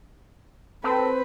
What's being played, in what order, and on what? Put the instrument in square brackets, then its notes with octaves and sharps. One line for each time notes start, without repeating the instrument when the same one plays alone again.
[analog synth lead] C4 [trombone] A4 [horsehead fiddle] B4